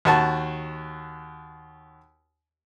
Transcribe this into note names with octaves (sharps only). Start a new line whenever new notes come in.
D#2 F#4 A5